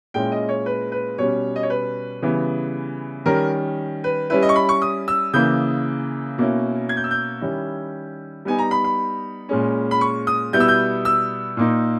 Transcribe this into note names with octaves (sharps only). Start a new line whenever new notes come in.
A#2 G#3 C#4 E4 G5
D#5
C#5
B4
B4
B2 G3 C#4 C#5
D#5
C#5
B4
C#3 E3 G3 B3
D#3 G3 C#4 A#4
B4
G3 C#4 E4 B4
D#5
C#6
B5
C#6
D#6
E6
C#3 E3 A#3 G6
B2 A#3 C#4 E4
G#6
G6
E6
G6
D#3 G3 C#4 E4
G3 B3 D#4 G#5
A#5
B5
B5
A#2 G#3 C#4
B5
C#6
D#6
B2 G3 B3 E4 G6
E6
G6
E6
A#2 A#3 D#4